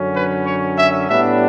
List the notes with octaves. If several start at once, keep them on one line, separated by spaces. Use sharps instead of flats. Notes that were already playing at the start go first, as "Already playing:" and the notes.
Already playing: F#2 D3 F#3 C#4
B4
C#5
E5
A2 G3 B3 D4 E5